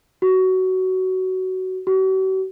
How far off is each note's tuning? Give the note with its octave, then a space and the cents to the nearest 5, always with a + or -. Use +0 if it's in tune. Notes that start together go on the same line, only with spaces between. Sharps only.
F#4 +15
F#4 +45